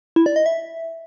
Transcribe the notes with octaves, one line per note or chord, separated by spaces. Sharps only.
E4
D5
D#5
E5